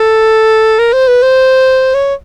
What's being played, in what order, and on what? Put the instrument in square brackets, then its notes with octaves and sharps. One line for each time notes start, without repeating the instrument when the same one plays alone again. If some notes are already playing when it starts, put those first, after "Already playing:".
Already playing: [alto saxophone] A4
A#4
C5
B4
C5
C#5